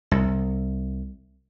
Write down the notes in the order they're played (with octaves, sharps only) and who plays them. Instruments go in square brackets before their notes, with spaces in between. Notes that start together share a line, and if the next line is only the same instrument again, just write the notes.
[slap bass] C2